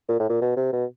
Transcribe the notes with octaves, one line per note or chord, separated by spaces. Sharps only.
A#2
A2
A#2
B2
C3
B2